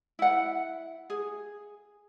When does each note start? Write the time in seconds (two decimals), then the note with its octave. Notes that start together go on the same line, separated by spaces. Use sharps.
0.19 E4 F#5
1.10 G#4